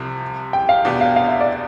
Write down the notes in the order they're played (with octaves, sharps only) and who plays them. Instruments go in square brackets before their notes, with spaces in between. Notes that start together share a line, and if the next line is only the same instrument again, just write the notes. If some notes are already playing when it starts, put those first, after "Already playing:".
Already playing: [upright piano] C2 C3 F3
[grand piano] G5
F5
[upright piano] E2 B2 B3 D4 G4
[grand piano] F5
F5
E5
D5